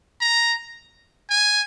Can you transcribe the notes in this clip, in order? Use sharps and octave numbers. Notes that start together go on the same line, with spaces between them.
A#5
G#5